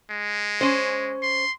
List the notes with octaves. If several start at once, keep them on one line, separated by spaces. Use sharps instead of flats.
G#3
C#4 C5
C6